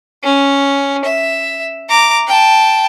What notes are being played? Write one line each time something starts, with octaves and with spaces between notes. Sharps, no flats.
C#4
E5
A#5 D6
G5 A5